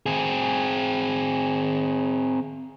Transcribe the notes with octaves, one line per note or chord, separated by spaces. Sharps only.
C4 G#4